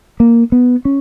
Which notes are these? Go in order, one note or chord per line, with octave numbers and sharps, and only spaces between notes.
A#3
B3
C#4